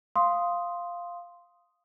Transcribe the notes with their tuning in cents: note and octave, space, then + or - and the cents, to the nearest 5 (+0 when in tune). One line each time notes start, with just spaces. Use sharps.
F5 +0 C6 +0 D#6 +0